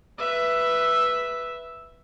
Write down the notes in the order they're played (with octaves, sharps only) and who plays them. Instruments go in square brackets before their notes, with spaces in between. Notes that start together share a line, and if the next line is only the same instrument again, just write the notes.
[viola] B4 E5